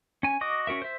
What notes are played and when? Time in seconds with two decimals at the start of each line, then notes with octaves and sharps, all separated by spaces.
0.23 C#4 G#5
0.41 F#4 D#5 D6 D#6
0.67 C#4 F#4 A#4 E5
0.82 C5 E5